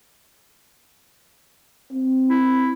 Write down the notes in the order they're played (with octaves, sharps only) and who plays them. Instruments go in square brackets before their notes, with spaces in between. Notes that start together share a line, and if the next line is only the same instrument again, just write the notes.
[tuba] C4
[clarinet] E4